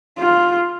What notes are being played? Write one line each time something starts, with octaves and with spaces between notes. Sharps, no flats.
F4